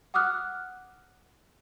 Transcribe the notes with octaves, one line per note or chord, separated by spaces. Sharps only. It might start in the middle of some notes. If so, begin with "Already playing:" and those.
F#5 D6 D#6 F6 F#6